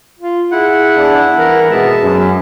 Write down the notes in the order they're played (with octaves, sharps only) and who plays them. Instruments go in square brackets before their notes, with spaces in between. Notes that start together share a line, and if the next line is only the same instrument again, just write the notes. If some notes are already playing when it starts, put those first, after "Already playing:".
[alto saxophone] F4
[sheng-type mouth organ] E4 F#5 [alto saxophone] G#4
[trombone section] E2 D4
[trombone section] E3 [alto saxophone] A#4
[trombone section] G#1 B2 B3 [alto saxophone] G#3 [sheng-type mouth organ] E5 A5
[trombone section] F#2